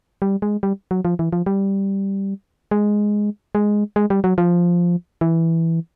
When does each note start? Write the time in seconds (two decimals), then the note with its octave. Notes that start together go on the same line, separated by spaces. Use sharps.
0.22 G3
0.42 G#3
0.63 G3
0.91 F#3
1.05 F3
1.19 E3
1.33 F3
1.46 G3
2.71 G#3
3.55 G#3
3.96 G#3
4.10 G3
4.24 F#3
4.38 F3
5.21 E3